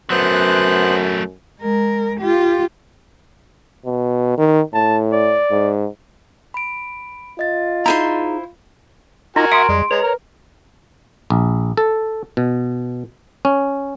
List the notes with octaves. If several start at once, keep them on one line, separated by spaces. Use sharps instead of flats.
F#2 F#3 A3 B3 C5 F#6
G#3 A#4
F4 G4
B2
D#3
A2 A5
D5
G#2
B5 D7
F4 D#5 A6
D#4 E4 G#4 C5 A#5 C6
D#4 F4 F#4 A#4 D#5 G#5 A#5
E5 F#5 C6 D#6 D7
F2 G3 G#3
G#3 B4 C#5 A#5
A#4
A#1
A4
B2
C#4